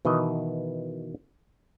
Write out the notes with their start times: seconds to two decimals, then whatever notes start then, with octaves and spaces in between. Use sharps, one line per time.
0.05 B2 D#3 E3 D#5